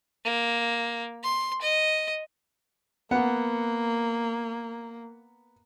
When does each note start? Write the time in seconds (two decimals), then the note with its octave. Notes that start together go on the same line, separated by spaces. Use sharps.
0.25 A#3
1.23 C6
1.62 D#5
3.11 A#3 B3 F#5